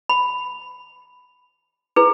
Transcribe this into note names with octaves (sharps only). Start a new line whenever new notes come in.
B5
E4 G#4 B4